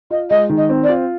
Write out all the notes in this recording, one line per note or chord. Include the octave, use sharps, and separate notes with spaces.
F4 D#5
G#3 D#5
D#3
D#5
C4
D5
F4